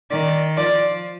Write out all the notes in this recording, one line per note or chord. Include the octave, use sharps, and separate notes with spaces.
D#3 D5
F3 D5